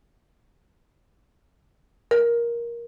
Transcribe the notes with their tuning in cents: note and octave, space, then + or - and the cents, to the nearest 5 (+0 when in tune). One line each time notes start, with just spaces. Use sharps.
A#4 +15